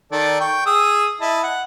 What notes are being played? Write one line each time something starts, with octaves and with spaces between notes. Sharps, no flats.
D#3 A4 D5
G5 C#6
G#4 D#6 E6
E4 D#5 A5
F#5